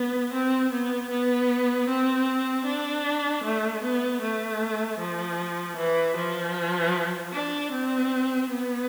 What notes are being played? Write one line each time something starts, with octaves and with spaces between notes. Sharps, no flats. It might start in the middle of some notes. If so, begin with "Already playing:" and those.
Already playing: B3
C4
B3
B3
C4
D4
A3
B3
A3
F3
E3
F3
D4
C4
B3